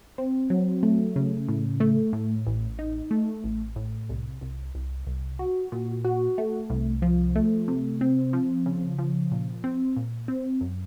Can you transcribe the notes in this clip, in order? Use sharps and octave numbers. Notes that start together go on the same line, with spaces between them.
C4
F#3
A3
C#3
A2
A3
A2
A1
D#4
A3
A1
A2
C2
C2
C2
C2
F#4
A#2
F#4
A3
C2
F3
A3
C3
C4
F3
C#3
F3
A#2
C4
A#2
C4
F#2